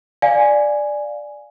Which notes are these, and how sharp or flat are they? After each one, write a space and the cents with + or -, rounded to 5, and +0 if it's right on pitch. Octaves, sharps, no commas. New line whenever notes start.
D5 +5 F5 +0 G#5 +0